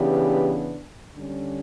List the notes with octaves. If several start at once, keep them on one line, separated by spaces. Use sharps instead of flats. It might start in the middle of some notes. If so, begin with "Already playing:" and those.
Already playing: C#3 E3 B3 D4 G4
D3 G3 C#4